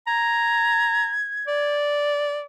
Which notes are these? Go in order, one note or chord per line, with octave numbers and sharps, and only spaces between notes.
A#5 G#6
D5